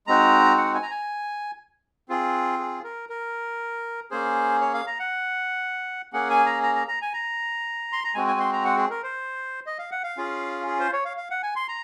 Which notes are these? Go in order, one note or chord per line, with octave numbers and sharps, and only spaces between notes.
G#3 C4 D#4 F#4 A#5
F#5
G#5
A#5
G#5
C4 F4 G#4
G#4
A#4
A#4
A#3 C#4 G#4 C5
C#5
F5
A#5
F#5
A#3 C#4 G#4 F#5
G#5
A#5
A#5
A#5
A#5
G#5
A#5
C6
A#5
G#3 C4 F#4 G#5
G#5
C6
A#5
F#5
G#4
A#4
C5
D#5
F5
F#5
F5
C#4 F4 G#4
G#4
C5
C#5
F5
F5
F#5
G#5
C6
A#5